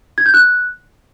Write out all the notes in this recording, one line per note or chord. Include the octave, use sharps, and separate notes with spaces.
G#6
G6
F#6